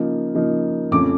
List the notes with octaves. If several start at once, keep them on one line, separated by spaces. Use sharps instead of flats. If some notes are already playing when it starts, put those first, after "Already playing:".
Already playing: C#3 F3 A#3 D#4
C#3 F3 A#3 D#4
F2 C#3 F3 A3 C#4 D6